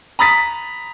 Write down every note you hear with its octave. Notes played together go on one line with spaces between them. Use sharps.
A#5 B5 D#6 A6 B6